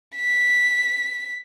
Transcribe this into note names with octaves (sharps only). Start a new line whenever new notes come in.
B6